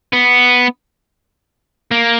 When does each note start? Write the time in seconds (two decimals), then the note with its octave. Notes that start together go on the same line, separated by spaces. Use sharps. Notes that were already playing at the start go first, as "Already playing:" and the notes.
0.13 B3
1.92 A#3